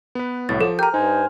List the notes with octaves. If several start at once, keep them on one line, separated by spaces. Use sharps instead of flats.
B3 B4
C2 A2 F#3 A6
F3 A4
G4 A#4 G5 A#5 F6 G6
G2 D#4 C5 G#5